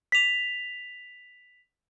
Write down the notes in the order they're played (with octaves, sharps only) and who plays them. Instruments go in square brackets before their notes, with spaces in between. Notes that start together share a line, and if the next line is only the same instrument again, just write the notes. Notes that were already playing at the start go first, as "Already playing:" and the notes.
[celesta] B6 F7